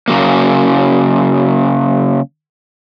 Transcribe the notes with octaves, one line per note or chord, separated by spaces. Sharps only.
C#3 F#3 A#3